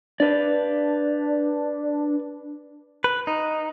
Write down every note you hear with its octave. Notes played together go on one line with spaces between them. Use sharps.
D4 B4 D5
B4
D#4